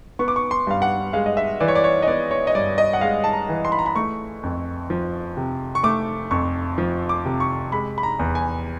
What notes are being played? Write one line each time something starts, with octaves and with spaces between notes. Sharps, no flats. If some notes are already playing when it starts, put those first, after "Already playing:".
B3 C#6
D6
C#6
C6
G2 F5
F#5
G#3 F5
D#5
E5
E3 D5
C#5
D5
C#5
D#5
B3 D5
C#5
D#5
G2 D5
D#5
F#5
G#3 F5
A5
A#5
E3
C6
B5
A#5
B5
A3 C#6
F2
F3
C3
C#6
A3 D6
F2 C#6
F3
D6
C3
C#6
G#3 B5
B5
A#5
E2
G#5